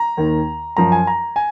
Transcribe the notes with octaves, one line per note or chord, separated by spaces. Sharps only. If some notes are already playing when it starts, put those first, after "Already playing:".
Already playing: A#5
D#2 D#3
F#2 F3 A#5
G#5
A#5
G#5